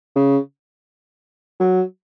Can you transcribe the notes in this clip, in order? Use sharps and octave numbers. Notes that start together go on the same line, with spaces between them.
C#3
F#3